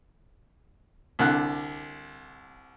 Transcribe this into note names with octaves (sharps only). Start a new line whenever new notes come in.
C2 D3 F#6